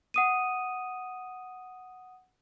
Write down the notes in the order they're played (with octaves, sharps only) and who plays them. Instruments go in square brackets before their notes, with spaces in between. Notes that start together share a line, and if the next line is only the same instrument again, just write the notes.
[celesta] F#5 D#6 D#7